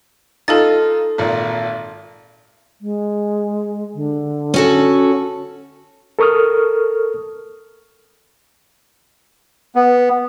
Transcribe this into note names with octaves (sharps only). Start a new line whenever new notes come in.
D#4 F4 A4 A5 A6
G#1 A#2
G#3
D3
C#4 F#4 A4
A4 A#4 C#6 D#6 F6
B3